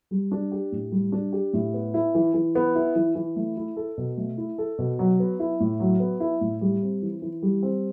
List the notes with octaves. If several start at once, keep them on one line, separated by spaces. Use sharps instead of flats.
G3
D4
G4
A2
G3
D4
G4
A2
B3
E4
E3
E3
B3
E4
E3
E3
A3
E4
A4
B2
A3
E4
A4
B2
F#3
B3
E4
A2
F#3
B3
E4
A2
G3
C4
E3
E3
G3
C4